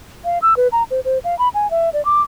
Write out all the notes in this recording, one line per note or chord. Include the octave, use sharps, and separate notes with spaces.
F5
E6
B4
A#5
C5
C5
F5
B5
G#5
E5
D5
D6